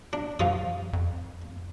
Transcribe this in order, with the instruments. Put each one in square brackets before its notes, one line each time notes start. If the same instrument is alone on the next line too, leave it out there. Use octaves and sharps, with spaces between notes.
[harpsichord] D4
[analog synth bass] F#2 [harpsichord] F3 F4 D#6
[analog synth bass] F2